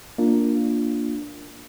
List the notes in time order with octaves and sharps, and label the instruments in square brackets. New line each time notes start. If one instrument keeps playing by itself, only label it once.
[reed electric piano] A#3 D4 F4